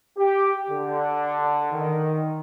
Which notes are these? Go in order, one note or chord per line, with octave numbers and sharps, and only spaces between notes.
G4
D3
D#3